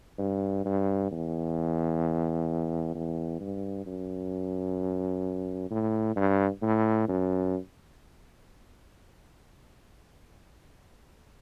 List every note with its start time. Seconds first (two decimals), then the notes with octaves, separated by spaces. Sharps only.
0.19 G2
0.65 G2
1.11 E2
2.95 E2
3.40 G2
3.86 F#2
5.71 A2
6.16 G2
6.62 A2
7.08 F#2